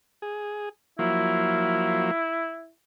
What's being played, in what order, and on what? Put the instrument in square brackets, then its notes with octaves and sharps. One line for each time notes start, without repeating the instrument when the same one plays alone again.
[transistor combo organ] G#4
[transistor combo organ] F3 F#3 A#3 [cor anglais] E4